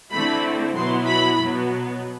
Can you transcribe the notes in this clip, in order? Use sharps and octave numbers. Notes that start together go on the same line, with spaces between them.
D3 A3 C4 E4 B5
B2 F#3 B3 E4 C6
B5
B2 F#3 B3